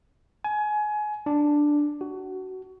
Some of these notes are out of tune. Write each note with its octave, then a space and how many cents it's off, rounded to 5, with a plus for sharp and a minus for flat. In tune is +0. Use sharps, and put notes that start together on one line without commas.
G#5 +25
D4 +5
F#4 +20